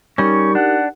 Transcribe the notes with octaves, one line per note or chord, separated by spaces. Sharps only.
G3 C#4 D#4 G4 A#4 C#6
D4 F#5